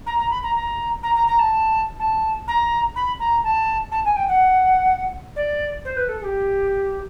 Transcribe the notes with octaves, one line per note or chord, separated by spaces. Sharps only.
A#5
A#5
B5
A#5
A#5
A#5
A#5
A#5
A5
A5
A#5
B5
A#5
A5
A5
G#5
G5
F#5
D5
C5
B4
A4
G#4
G4